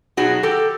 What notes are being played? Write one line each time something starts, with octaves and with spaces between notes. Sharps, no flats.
B2 F#3 B3 D#4 F#4 G#4
G4 A4